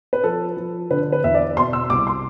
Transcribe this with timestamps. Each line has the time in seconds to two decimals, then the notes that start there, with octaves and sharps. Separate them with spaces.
0.13 B4
0.24 F3 A4
0.57 F3
0.90 D3 B4
1.12 B4
1.24 E2 E5
1.34 D5
1.57 B2 C6
1.73 E6
1.90 C2 D6
2.07 C6